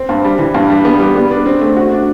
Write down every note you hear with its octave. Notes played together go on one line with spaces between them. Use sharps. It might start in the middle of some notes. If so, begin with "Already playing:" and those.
Already playing: C4
G2
G3
E3
G2
G3
B3
G3
B3
D4
C4
A3
F#4
D4